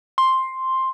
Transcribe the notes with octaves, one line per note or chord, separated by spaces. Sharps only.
C6